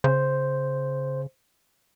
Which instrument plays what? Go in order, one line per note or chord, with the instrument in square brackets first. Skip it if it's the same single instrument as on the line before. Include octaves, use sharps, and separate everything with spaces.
[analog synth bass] C#3 [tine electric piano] C5